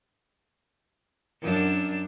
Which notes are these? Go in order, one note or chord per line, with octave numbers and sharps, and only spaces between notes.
F#2 D4